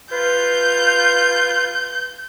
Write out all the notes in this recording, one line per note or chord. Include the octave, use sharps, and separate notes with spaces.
F4 B4 G6